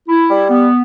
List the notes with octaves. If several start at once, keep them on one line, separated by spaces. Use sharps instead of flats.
E4
G3
B3